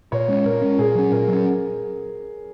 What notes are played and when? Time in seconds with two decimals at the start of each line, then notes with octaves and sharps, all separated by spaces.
0.12 A#2 C#5
0.28 G#3 C#4
0.45 A#2 A#4
0.62 G#3 C#4
0.79 A#2 G#4
0.95 F#3 C#4
1.12 A#2 A#4
1.28 F#3 C#4